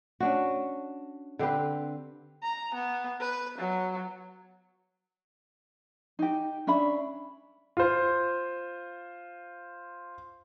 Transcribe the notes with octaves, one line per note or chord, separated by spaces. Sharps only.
C#4 D4 F#4
D3 C4 G4 B4
A#5
B3
B4
F#3
D#4 G4
C#4 D4 E5 B5
F4 C5